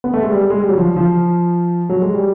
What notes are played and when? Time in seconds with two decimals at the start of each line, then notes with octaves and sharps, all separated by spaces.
0.04 B3
0.14 A3
0.22 G#3
0.32 G3
0.50 G#3
0.59 G3
0.69 F#3
0.78 F3
0.97 F3
1.89 F#3
2.02 G#3
2.14 G3